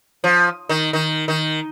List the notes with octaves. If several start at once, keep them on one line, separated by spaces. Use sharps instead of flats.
F3
D#3
D#3
D#3